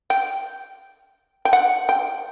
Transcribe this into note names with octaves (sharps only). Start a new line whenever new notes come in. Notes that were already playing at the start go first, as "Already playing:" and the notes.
G5
G5
F#5
G5